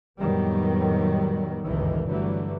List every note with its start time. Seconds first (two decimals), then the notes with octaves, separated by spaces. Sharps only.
0.19 F2 A2 D#3 F#3 G3 B3
1.65 G1 C#2 F#2 A2 D#3 E3
2.09 G2 D3 E3 F#3 A3